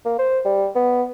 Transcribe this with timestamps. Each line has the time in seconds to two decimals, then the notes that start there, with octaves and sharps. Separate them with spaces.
0.05 A#3
0.19 C5
0.45 G3
0.76 B3